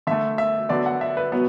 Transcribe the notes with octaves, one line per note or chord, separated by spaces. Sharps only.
D3 A3 E5
E5
D3 F#3 B3 D5
F#5
E5
B4
B2 F#3 B3